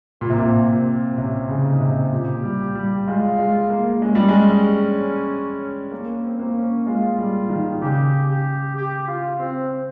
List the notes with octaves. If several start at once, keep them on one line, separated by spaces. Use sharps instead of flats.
A#2 A#3
C3
A#2
C4
C3 C#4
C#3
D#4
C3
A#2 G4
G3
G3
G#3 F4
G#3
A#3
G#3 C#4
G3
G#3
A#3 C#4
C4
A#3
C#4
G#3 F4
G3
D#3
C#3 G4
G4
G4
F4
C4